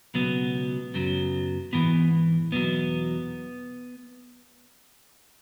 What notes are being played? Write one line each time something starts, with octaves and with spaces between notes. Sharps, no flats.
C#2 B2 F#3 B3
F#2 C#3 F#3
G#2 E3 B3
E2 B2 F#3 B3